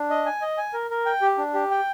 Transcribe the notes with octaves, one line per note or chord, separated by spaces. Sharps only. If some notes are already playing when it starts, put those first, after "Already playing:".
Already playing: D4
D#5
G#5
D#5
G#5
A#4
A#4
G5
G4
D4
G4
G5